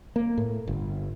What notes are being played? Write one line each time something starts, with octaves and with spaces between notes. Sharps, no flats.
A#3
A2
G1